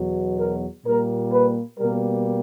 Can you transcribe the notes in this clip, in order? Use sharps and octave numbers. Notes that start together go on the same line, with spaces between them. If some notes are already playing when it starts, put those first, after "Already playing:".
Already playing: E2 B2 F#3
A#4
A#2 G3 A#3 A#4
B4
B2 G3 A#3 A#4